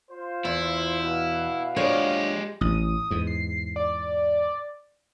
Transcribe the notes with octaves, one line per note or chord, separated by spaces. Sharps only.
F4 C5
E2 E4
B2 B4 F5
F3 G#3 D4 G4 C#5
A1 D#6
E2 G#2
C7
D5